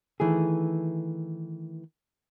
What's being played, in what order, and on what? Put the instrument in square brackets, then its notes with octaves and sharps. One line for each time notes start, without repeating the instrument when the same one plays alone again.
[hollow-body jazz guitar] D#3 E3 A3 G#4